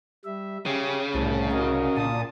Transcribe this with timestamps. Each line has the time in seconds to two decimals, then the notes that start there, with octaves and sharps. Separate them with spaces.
0.25 G3 E5
0.66 C#3 C#4 G4
1.15 C2 A2 A5
1.51 C2 F#4 A#4 D#5
1.97 A#2 A5 D#6